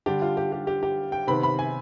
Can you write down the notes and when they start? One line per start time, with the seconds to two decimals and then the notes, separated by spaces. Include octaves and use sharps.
0.06 D3 G3 D4 G4
0.22 F4
0.37 G4
0.52 G4
0.67 G4
0.83 G4
1.12 G5
1.27 C3 D#3 B3 B5
1.43 B5
1.59 G#5